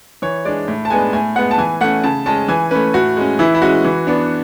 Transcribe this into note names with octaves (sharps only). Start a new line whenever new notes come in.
E3 C#5
G#3 D4 D5
A2
A5
G#3 B3 D4 G#5
A2 G#5
G#3 B3 F#5
A5
E3 G#5
A3 C#4 F#5
C#3 A5
G#3 C#4 A5
E3 G#5
A3 C#4 B4
A2 F#4
G#3 C#4
E3 E4
E4
G#3 C#4 F#4
E3
B3 D4